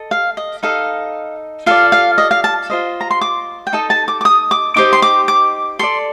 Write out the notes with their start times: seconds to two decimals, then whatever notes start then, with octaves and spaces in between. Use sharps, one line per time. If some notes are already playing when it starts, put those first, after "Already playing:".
Already playing: A4 D#5
0.11 F5
0.37 D#5
0.63 D#4 A4 D#5 F5
1.66 F4 A4 D5 F5
1.92 F5
2.18 D#5
2.31 F5
2.44 A5
2.70 F4 C5 D#5
3.01 A#5
3.11 C6
3.21 D6
3.67 G5
3.73 D#4 A4 D#5 A5
3.90 A5
4.08 D6
4.21 D6
4.25 D#6
4.51 D6
4.76 D#4 G4 C5 D#5 D6
4.93 C6
5.02 D6
5.28 D6
5.79 A4 D5 C6